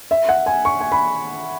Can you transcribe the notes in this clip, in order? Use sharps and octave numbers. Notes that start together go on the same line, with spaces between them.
E5
F#5
G#5
C#6
G#5
B5